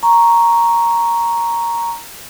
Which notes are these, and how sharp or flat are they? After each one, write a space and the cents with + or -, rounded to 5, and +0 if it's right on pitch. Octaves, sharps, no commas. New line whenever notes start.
A#5 +0 C#6 +0